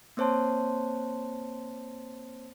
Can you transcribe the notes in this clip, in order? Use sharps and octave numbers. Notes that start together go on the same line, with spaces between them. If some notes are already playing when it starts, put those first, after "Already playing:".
A#3 C4 C5 C#5 A5 C6